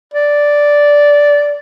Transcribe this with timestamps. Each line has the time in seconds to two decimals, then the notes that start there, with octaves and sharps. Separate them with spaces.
0.14 D5